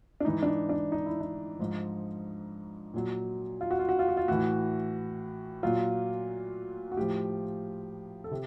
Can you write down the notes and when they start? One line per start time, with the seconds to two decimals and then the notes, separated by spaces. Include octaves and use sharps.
0.20 D4
0.25 G#2 E3 D#4
0.43 D4
0.47 D#4
0.69 D4
0.92 D#4
1.06 E4
1.20 D#4
1.59 G#2 F3
2.94 A#2 F#3
3.61 F4
3.71 F#4
3.79 F4
3.89 F#4
3.99 F4
4.08 F#4
4.17 F4
4.28 A2 E3 F#4
5.63 A#2 F#3 F4
6.92 F#4
6.96 A2 F3 G4
8.24 A4
8.31 C3